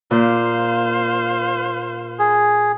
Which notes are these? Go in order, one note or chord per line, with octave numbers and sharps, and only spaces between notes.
A#2 C5 F5
G#4